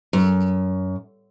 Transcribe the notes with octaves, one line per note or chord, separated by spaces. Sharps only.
F#2